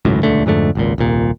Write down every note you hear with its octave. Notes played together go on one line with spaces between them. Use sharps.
G#1 C#2 F#2 A2
D#1 C#2 D3 A3
F2 G#2 D3 A3
G#1 C#2 A#2
D#1 C2 A#2